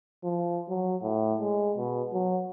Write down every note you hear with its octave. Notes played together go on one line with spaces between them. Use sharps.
F3
F#3
A2
G#3
B2
F#3